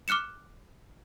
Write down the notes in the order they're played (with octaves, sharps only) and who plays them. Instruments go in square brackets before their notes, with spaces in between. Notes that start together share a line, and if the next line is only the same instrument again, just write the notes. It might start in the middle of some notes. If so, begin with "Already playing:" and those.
[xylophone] D6 F6 F#6 C#7 E7